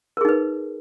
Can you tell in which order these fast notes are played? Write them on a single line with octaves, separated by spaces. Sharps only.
A#4 G#4 D#4 B4